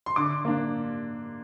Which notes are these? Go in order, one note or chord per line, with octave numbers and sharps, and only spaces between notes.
C6
D3 D6
A#3 D4